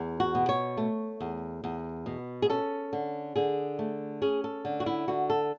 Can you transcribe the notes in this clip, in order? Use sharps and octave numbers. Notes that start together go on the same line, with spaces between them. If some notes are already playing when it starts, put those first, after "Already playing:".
Already playing: E2
F#4
B2
C#5
A3
E2
E2
B2
G#4
C#4 A4
D3
D3 G#4
A3
C#4 G#4
A4
D3
F#4
E4
D3 F#4
A4